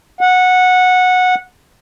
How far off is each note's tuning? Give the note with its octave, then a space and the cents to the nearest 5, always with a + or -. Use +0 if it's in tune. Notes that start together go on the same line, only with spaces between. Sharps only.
F#5 -15